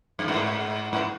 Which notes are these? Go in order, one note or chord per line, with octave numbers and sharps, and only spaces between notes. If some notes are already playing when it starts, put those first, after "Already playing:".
G2
G#2
G#2